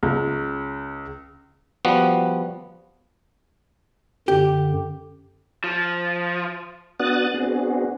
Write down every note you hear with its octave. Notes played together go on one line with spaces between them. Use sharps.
C#2
F3 G3 B3 F#4
F#2 D3 G4
F3
B3 D4 F#4 D#6 F#6 A6
B3 C4 D4 F#4 G#4